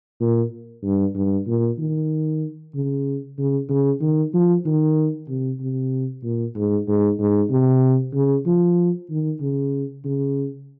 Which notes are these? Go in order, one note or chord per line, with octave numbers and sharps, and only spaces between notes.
A#2
G2
G2
A#2
D#3
C#3
C#3
C#3
D#3
F3
D#3
C3
C3
A#2
G#2
G#2
G#2
C3
C#3
F3
D#3
C#3
C#3